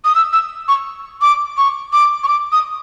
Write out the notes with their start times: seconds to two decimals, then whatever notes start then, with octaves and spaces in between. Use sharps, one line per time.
0.05 D#6
0.15 E6
0.33 E6
0.68 C#6
1.22 D6
1.58 C#6
1.93 D6
2.23 C#6
2.28 D6
2.52 D#6